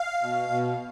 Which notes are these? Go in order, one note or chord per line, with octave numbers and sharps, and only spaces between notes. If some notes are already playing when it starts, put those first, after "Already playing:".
Already playing: F5
B2
B2